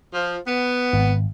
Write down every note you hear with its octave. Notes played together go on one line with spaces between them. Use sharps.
F3
B3
G#1